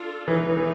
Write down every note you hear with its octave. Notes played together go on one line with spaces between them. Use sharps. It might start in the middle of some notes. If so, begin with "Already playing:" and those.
Already playing: D4 F4 A4
E3 G#3 B3 D#4 G#4
E3
E3